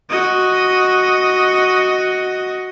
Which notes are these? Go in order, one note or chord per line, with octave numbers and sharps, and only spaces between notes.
F#4 D#5